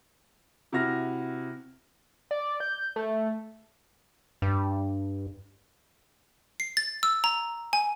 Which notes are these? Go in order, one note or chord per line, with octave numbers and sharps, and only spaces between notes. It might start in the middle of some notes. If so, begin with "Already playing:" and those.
C3 E4 F#4 F6 A#6
D5
G6
A3
G2
C7
A6
E6
A#5
G#5